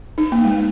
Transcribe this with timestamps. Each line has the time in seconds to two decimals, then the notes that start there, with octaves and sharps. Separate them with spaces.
0.18 D#4
0.32 A#3
0.45 G#3